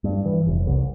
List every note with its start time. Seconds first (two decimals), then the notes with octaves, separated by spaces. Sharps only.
0.04 G2
0.25 E3
0.47 F1
0.67 C2